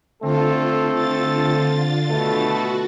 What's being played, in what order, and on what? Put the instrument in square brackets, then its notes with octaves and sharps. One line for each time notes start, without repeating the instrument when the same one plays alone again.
[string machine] D3 F4 [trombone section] A3 C4 A4
[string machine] D3 F4 A6
[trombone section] B2 A3 A4
[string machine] F#4